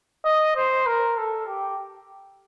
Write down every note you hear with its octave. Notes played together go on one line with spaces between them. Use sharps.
D#5
C5
A#4
A4
G4